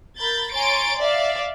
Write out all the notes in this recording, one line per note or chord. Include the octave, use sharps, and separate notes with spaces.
A#4 B5 G6 A6
C#5 G#5 A#5 C6 A6 D7
D5 E5 F5